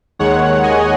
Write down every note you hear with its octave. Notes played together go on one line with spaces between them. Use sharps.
D#2 D#3 G#3 C#5 F#5
D#5 G#5